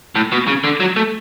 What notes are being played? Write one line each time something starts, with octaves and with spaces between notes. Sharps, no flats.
A2
B2
C#3
D3
F#3
A3